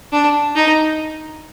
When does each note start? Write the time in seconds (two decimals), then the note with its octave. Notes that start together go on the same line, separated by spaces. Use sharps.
0.12 D4
0.56 D#4